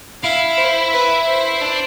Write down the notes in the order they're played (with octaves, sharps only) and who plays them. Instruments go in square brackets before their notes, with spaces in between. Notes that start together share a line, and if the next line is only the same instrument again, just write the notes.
[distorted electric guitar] E4 [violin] F5
[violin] C5
B4
C5
[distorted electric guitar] D4